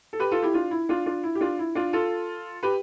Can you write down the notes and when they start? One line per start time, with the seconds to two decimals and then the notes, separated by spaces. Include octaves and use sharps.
0.13 A4
0.19 G4 B4
0.31 F4 A4
0.43 E4 G4
0.54 D4 F4
0.71 E4
0.89 D4 F4
1.06 D4 F4
1.23 E4
1.35 G4
1.41 D4 F4
1.59 E4
1.75 D4 F4
1.93 F4 A4
2.63 G4 B4